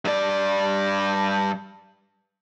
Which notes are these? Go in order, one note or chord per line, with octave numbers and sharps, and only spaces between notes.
G2 D5